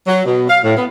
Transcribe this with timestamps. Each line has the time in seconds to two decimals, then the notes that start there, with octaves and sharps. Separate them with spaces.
0.07 F#3
0.25 B2
0.49 F5
0.63 A2
0.77 B3